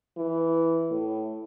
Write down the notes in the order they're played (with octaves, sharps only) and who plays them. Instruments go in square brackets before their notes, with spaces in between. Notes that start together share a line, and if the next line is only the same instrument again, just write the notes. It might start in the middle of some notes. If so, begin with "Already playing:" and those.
[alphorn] E3
A2